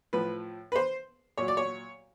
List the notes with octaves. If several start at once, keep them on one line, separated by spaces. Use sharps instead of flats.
A2 F3 B4
B4
C5
A#2 F#3 C#5
D5
C#5